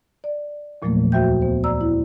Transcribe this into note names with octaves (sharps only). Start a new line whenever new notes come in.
D5
E2 A#2 F3 F#3 A3 A#3
D2 F#4 C5 E5 G5 G6
B3 C5
D5 A#5 E6
E4